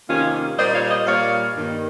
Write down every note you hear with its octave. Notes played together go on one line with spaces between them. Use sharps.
F2 C3 D#3 A#3 C#4 F4
A#2 G3 A#3 C5 D#5
C#5 F5
C5 D#5
A#2 G3 A#3 C#5 F5
G2 D#3 A#3